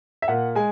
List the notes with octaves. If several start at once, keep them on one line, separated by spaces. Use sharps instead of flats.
E5
A#2 F#5
G#3 G#5